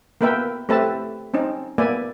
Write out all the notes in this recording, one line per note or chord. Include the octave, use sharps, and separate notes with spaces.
A#3 B3 A#4 B4 E5 G5
A3 C4 G4 B4 E5 A5
C4 C#4 D#4
A#3 B3 D5 E5 G#5